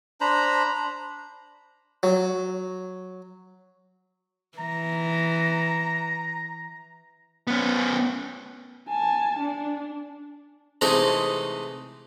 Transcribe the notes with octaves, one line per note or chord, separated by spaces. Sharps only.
D4 C5 A#5 B5
F#3
E3 A#5
B3 C#4
G#5 A5
D4
C3 E3 G#3 A3 D#4 A4